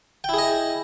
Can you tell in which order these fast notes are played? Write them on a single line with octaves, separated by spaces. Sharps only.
G5 E4 G#4 D#5